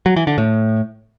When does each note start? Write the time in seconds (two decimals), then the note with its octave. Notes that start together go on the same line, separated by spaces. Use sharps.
0.06 F#3
0.16 E3
0.27 D3
0.38 A2